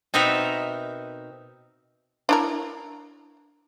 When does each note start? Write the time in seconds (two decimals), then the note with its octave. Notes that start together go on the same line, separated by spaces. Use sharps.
0.14 B2 C4 D#4 A#4 E5 F#5
2.29 D4 E4 A#4